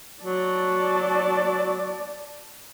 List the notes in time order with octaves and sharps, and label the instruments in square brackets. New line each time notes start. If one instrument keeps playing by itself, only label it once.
[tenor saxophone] F#3 [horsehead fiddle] D5 A5